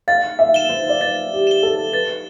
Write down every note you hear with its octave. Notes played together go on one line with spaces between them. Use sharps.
F5 A6
E5
E7 G7
C5
D5
C5 A6
G4
E7 G7
A4
B4 A6